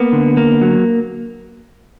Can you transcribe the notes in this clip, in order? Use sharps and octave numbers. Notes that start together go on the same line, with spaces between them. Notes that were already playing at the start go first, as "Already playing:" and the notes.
Already playing: A#3 B3
D3
A#3
F#3